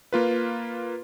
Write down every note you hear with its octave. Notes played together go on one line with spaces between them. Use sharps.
A#3 F4 B4